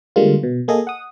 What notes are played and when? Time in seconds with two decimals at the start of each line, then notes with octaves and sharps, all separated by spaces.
0.16 D3 G3 G#3 A#3 F4
0.43 B2
0.68 A#3 G#4 A4 D#5
0.87 F#5 D#6